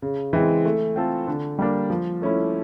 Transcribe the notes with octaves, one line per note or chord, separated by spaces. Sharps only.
C#3
E3 G#3 C4
A3
C4 F4 A4
D3
G3 A#3 D4
F3
A3 C#4 E4